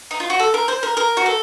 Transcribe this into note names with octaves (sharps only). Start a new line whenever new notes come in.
D#4
F4
F#4
A4
A#4
C5
A#4
A#4
F#4
A4